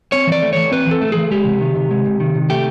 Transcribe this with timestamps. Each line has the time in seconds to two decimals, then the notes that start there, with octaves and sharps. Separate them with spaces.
0.12 C4 C#5
0.27 E3 D5
0.42 A3
0.53 E3 C#5
0.71 C4 B4
0.87 E3 A4
1.01 A3
1.12 E3 G#4
1.31 G#3 G4
1.45 C3
1.61 D#3
1.76 C3
1.91 G#3
2.06 C3
2.20 D#3
2.36 C3
2.50 A3 G4